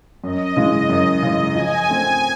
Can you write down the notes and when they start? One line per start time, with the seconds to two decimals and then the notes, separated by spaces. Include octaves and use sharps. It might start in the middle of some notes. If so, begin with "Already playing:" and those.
0.23 F#2 D#5
0.56 C#3 E3 G#3
0.90 F#2
1.22 C#3 E3 G#3
1.55 F3 G#5
1.89 A3 C4